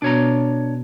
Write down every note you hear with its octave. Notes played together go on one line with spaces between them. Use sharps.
B2 B3 D4 F#4 C#5 A#5